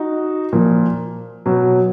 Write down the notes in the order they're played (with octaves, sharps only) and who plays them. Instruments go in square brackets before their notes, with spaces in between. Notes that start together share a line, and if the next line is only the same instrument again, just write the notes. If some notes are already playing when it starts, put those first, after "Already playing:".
Already playing: [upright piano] D#4 F#4
A#2 F3
B2 F#3